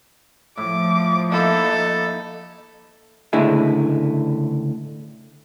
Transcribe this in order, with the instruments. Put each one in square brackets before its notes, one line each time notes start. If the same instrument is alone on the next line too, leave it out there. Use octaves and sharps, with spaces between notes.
[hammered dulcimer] A2 [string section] F3 [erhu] D6
[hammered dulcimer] A#3 E4 [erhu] D#4 [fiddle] A4
[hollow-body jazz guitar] C#2 A2 D3 E4 G#4